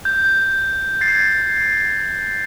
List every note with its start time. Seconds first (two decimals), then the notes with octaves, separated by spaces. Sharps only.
0.05 G6
1.01 G#6 A6 C7